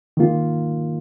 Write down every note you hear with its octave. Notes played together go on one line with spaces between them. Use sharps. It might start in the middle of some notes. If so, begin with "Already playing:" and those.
D#3 A#3 F4